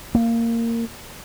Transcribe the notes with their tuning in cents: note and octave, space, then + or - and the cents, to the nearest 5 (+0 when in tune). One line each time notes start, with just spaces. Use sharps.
A#3 -15